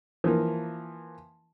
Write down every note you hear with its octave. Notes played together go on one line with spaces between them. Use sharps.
E3 F3 A#3